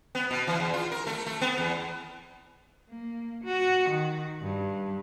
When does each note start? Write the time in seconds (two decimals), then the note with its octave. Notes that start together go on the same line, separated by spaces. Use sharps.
0.15 B3
0.31 B2
0.47 E3
0.60 E2
0.74 F4
0.92 A#4
1.07 A3
1.26 A3
1.41 B3
1.58 E2
2.90 A#3
3.44 F#4
3.89 D#3
4.42 G2